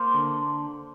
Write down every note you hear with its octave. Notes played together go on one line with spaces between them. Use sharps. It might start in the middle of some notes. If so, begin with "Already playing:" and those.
Already playing: A#3 C5
D3